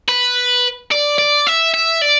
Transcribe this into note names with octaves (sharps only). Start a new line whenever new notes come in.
B4
D5
D5
E5
E5
D5